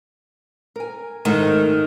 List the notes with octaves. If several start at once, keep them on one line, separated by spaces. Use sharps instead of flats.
A#4 G#5
G#2 D#3 A3